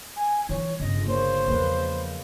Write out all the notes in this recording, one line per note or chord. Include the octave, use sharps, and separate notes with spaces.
G#5
E3 G3 C#5
G1 C#3 D#5
A#3 C5 C#5
E2 F3 G#3 A#3 B4